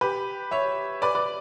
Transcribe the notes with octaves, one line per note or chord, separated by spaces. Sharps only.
G4 B4
C#5 E5
B4 D5
B4 D5